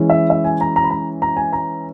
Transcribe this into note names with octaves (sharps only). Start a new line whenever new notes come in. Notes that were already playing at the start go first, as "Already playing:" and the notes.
Already playing: E3 G#3 C#4 E4
E5
E5
G#5
A#5
A#5
B5
A#5
A#5
G#5
A#5